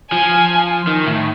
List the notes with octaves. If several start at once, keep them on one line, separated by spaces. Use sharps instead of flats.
F3 G#5
D#3
A2